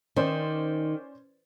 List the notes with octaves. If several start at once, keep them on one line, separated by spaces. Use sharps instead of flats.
D#3 C#4 C5 D5